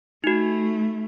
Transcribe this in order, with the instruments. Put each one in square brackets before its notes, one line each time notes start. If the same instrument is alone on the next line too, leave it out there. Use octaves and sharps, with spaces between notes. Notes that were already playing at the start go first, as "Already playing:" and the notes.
[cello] A3 [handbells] D#4 F#4